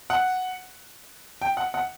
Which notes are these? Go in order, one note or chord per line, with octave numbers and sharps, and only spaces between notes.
F#5
G5
F#5
F#5